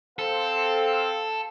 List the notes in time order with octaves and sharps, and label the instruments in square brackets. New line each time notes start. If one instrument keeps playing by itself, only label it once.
[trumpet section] C4 C5 F5 [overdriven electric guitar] A4